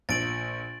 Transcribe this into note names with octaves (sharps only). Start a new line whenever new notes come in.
A#1 A6 D7 F#7